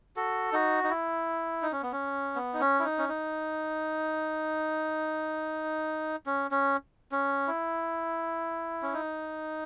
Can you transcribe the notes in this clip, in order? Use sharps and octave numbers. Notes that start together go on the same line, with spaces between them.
F#4 A4
D#4 F#4
D#4
E4
D#4
C#4
B3
C#4
B3
D#4
C#4
E4
D#4
C#4
D#4
C#4
C#4
C#4
E4
C#4
D#4